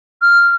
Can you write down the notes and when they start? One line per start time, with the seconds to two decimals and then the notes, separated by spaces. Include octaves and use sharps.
0.22 F6